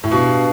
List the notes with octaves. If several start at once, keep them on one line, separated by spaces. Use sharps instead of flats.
A2
B2 D4 G4 B4 F5